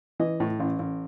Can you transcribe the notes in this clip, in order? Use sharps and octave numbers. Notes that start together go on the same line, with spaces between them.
E3 D#5
A2
A1
A1